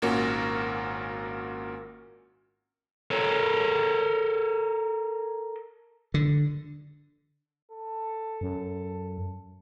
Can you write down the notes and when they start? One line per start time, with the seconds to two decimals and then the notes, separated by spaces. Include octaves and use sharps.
0.02 G#1 A#2 A#3 C#4 F#4 A#4
3.11 A4 A#4 C#5
6.14 D3
7.72 A4
8.41 F#2